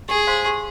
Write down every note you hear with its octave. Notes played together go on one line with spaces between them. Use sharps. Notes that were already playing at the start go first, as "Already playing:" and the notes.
G4 G#4
C5 F5 C6
G4